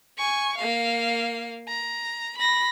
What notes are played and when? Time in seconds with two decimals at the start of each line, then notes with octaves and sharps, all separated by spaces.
0.18 G#5 C#6
0.57 A#3 F5
1.68 A#5
2.38 B5 A#6